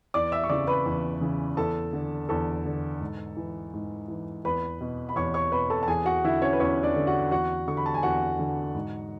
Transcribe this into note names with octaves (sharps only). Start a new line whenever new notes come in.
E2 D5 D6
E5 E6
C#6
C#3 E3 D5 D6
B4 B5
E2
C#3 E3
E2 A4 A5
D3
E2 A4 A5
D3
G#2
E3
G#2
E3
E2 B4 B5
B2
B5
E2 C#5 C#6
C#5 C#6
B2 B4 B5
A4 A5
A5
E2 G#4 G#5
F#4 F#5
D3 E4 E5
C#4 C#5
B4
E2 C#4 C#5
D4 D5
D3
F#4 F#5
E2 F#4 F#5
D3 C#6
B5
A5
G#5
E2 F#4 F#5
D3
G#2